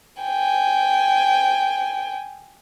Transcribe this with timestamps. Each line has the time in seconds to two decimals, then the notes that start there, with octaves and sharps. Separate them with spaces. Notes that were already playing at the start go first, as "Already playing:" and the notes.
0.23 G5 G#5